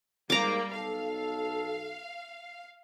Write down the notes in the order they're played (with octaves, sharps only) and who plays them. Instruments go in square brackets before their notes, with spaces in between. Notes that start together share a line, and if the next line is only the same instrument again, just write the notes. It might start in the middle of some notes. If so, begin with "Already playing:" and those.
[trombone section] G#2 A#4 [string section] G3 A#3 [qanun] A#5 D6
[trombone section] B1 A4 [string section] F5